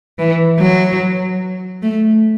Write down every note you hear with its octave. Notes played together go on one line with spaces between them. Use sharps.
E3
F#3
A3